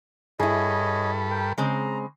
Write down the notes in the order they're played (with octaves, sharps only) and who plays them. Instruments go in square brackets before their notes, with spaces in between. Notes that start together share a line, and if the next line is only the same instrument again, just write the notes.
[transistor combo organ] G2 A4 B5 [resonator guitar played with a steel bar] E4 G#4 [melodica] C#5 D#5
[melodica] A#4 G5
[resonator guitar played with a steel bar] C#3 G#3 C4 [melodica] A#5